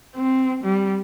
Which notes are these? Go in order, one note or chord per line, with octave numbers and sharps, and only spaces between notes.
C4
G3